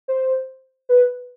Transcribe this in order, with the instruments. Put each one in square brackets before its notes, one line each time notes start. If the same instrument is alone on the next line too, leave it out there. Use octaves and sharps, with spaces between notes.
[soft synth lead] C5
B4